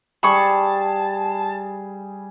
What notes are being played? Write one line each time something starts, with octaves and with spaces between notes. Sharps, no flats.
G3 G#4 A5 B5 C#6